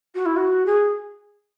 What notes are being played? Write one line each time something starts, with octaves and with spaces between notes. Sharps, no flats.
F#4
E4
F#4
G#4